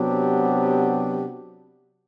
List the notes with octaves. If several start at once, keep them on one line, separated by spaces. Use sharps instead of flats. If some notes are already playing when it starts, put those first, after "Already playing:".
Already playing: C3 F#3 B3 D4 G4